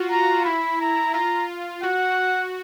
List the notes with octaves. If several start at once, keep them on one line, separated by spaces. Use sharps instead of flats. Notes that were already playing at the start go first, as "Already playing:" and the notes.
Already playing: F4 F#4
F4 A#5
E4 B5
A#5
F4 A#5
F#4 F#5